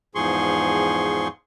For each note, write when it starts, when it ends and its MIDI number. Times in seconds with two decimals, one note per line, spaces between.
0.15 1.28 40
0.15 1.28 44
0.15 1.28 53
0.15 1.28 68
0.15 1.28 84
0.15 1.28 85